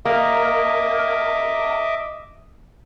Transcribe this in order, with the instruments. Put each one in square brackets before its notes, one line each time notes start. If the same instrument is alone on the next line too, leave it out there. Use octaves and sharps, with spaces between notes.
[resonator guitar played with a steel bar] A#3 [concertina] D#5 E5 D6